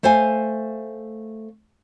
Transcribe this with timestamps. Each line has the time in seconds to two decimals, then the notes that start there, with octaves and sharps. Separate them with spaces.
0.03 A3 C5 F5 G#5